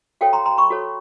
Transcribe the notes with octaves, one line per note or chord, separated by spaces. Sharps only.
F#4 A4 C#5 F5 G5
A#5 C6
A#5 C6
B5 C#6
F#4 A4 C#5